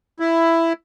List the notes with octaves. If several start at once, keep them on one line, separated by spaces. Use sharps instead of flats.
E4